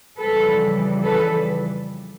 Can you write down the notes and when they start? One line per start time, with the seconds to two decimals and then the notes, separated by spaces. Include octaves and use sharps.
0.19 F2 C#3 E3 G3 A4 B4
1.04 A4 B4